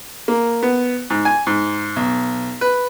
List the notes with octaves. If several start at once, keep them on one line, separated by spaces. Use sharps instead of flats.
A#3
B3
G#2
G#5
G#2
B1
B4